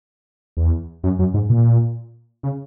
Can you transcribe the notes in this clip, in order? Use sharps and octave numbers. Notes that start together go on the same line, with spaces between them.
E2
F#2
F#2
G#2
A#2
C#3